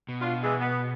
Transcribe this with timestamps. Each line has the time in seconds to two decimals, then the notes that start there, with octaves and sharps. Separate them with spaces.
0.09 B2
0.20 D4 F4
0.43 E3 G#3
0.60 B3